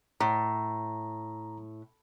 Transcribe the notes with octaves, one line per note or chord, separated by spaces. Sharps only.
A2 A#5